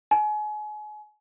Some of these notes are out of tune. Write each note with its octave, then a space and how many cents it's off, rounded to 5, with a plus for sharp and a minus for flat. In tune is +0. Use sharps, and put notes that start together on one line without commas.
G#5 +35